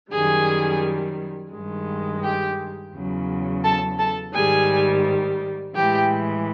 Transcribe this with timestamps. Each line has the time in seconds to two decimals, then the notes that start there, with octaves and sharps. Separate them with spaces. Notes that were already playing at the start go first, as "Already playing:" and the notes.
0.11 F#2 D#3 G3 G#4 G#5
1.53 G2 D#3 G#3
2.23 G4 G5
2.94 E2 C#3 F#3
3.64 A4 A5
3.99 A4 A5
4.34 G#2 D#3 G3 G#4 G#5
5.75 A2 E3 G#3 G4 G5